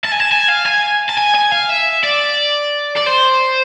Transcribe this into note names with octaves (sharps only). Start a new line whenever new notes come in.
A5
G#5
A5
G#5
F5
G#5
A5
G#5
G#5
F5
E5
D5
D5
C5